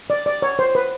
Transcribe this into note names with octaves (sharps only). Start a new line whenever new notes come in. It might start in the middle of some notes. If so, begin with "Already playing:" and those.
D5
D5
C#5
C5
B4